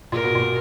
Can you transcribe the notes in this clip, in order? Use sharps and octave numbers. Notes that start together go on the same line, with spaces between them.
A#2 A#4
B2
A#2